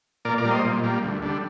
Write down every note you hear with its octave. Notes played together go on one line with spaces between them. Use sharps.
A#2 A#4 D5
A#4 D5
G3 A#3
C5 D#5
A#2
G3 A#3
D2
D3 G3